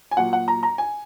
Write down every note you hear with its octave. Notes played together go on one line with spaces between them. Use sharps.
G#5
A#2 F#3 F#5
F#5
A#5
A#5
G#5